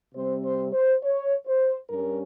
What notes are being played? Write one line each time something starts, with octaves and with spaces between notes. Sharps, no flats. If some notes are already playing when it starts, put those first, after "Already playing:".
C3 G3 C4 C5
C5
C5
C#5
C5
G2 G3 C#4 A#4